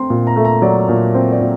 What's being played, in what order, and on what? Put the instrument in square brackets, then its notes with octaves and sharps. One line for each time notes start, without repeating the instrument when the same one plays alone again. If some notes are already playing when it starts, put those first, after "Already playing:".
Already playing: [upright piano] A3 C4 A#5 C6
A#2
A#5
A3
A#5
F#3 D5
A#2
C4 C5
D5
A#2